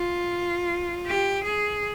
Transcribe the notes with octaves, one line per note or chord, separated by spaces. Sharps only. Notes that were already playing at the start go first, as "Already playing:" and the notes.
Already playing: F4
G4
G#4